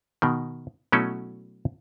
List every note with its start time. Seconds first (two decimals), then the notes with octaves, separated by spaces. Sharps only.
0.22 B2 D#3
0.92 B2 F#3 A3 C#4 E4 A4